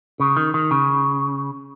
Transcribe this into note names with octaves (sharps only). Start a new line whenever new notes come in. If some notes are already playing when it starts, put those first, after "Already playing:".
C#3
D#3
D#3
C#3